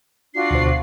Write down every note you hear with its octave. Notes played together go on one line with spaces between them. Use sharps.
D4 F4 F#4 C7
D2 B2 C5